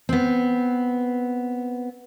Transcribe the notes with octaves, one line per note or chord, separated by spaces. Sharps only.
B3 C4